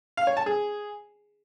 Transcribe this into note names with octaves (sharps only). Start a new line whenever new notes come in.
F5
C#5
A5
G#4